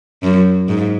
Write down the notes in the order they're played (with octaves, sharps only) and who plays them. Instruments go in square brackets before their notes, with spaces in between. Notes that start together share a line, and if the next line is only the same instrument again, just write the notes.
[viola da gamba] F#2
G#2